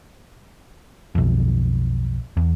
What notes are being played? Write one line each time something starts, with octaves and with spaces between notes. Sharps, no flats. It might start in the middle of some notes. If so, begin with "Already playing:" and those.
B1 F2
E2